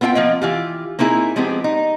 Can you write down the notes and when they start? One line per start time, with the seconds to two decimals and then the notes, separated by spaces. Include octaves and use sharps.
0.01 B3 C4 F4 F5 G5
0.15 F3 A#3 C4 D#5
0.42 E3 F4 G4
0.99 A#3 C4 D#4 E4 G#4
1.36 F3 G#3 B3 C4 G4
1.64 D#4